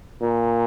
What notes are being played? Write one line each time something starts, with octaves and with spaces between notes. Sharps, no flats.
A#2